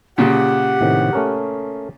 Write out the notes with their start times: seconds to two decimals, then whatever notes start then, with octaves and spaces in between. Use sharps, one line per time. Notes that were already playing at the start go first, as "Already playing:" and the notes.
0.18 A#2 C#3 G4 F#5
0.81 A2 C3 D#3
1.13 A3 C#4 A#4